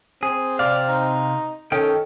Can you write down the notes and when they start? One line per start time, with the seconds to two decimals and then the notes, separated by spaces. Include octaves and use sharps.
0.23 C4 G#4
0.59 C3 D5 F5
0.89 D#4
1.72 D#3 C#4 A4 G5